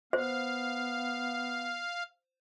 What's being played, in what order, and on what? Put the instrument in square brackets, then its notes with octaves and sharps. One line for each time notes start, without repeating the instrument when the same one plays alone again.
[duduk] B3 [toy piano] C5 [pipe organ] F5